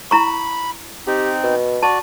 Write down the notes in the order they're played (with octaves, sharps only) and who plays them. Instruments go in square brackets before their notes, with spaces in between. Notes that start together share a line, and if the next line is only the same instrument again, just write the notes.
[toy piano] E4 A#5 C#6 [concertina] B5
[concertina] C4 D#4 [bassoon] G4
[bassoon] B2
[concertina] F#4 D5 [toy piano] A5